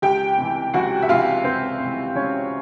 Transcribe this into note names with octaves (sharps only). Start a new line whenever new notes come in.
C#2 G4 G5
C3 E3
C#2 F#4 F#5
E5
C3 E3 F4 F5
C#2 C4 C5
C3 E3
C#2 C#4 C#5